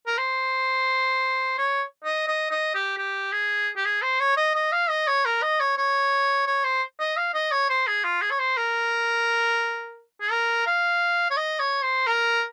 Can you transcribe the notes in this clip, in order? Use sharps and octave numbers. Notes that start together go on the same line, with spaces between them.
A#4
C5
C#5
D#5
D#5
D#5
G4
G4
G#4
G4
G#4
C5
C#5
D#5
D#5
F5
D#5
C#5
A#4
D#5
C#5
C#5
C#5
C5
D#5
F5
D#5
C#5
C5
G#4
F4
G#4
C#5
C5
A#4
G#4
A#4
F5
C#5
D#5
C#5
C5
A#4